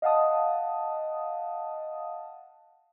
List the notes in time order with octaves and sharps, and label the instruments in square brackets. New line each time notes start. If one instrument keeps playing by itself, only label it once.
[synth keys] D#5 F5 F#5 A5 D#6